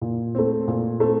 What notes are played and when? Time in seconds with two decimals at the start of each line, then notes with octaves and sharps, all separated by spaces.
0.02 A#2
0.35 A3 C4
0.68 A#2
1.00 A3 C4